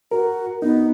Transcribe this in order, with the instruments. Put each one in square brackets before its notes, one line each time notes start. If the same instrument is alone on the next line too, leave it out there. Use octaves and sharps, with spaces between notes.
[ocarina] F#4 [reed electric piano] A#4
[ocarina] B3 [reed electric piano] D#4